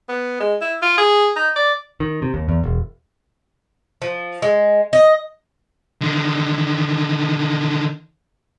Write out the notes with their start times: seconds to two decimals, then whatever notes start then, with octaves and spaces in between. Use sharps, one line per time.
0.09 B3
0.40 G#3
0.61 E4
0.82 F4
0.98 G#4
1.36 D#4
1.56 D5
2.00 D#3
2.22 C3
2.34 D#2
2.49 E2
2.64 E1
4.02 F3
4.42 G#3
4.93 D#5
6.01 D3 D#3